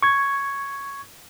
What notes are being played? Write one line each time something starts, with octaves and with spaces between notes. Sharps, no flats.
C#6 G#6